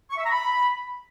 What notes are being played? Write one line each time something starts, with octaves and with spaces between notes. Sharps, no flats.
C#6
E5
A#5
B5